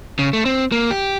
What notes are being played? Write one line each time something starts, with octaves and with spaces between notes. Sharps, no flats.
C#3
A3
C4
A#3
G4